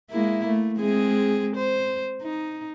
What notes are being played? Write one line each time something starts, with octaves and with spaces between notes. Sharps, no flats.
G#3 A#3 E4
A3
G#3 C4 G#4
C5
D#4